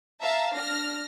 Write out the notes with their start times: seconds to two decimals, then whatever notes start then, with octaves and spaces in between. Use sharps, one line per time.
0.22 E5 F5 A5 A#5
0.55 D4 F6 A#6